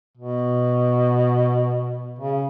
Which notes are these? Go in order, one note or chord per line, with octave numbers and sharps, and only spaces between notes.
B2
C#3